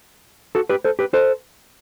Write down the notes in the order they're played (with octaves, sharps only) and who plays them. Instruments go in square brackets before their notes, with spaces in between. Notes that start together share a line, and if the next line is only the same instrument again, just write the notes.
[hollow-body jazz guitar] F#4 A4
G4 B4
A4 C5
G4 B4
A4 C5